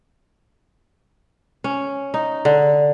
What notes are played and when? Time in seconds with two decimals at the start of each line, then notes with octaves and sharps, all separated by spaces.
1.64 C#4
2.14 D#4
2.45 D3